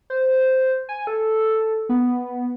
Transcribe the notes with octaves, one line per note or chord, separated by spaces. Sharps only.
C5
G#5
A4
B3